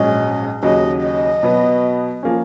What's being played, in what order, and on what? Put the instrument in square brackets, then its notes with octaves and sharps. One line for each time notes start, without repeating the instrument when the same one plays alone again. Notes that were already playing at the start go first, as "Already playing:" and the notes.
Already playing: [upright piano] A#1 G#2 F#3 C#4 [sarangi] D#5
[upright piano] D#2 C#3 F#3 [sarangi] D#5
[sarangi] D#5
[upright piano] B2 F#3 B3
F3 A#3 C#4